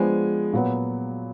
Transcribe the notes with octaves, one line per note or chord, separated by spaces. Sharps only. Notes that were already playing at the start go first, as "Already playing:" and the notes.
Already playing: F3 G#3 B3 D4 G#5
A#2 F#3 B3